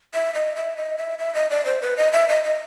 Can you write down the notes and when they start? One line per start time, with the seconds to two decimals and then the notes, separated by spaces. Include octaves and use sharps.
0.14 E5
0.34 D#5
0.56 E5
0.77 D#5
0.98 E5
1.19 E5
1.35 D#5
1.50 D5
1.65 C5
1.82 B4
1.97 D#5
2.13 E5
2.29 D#5
2.44 D#5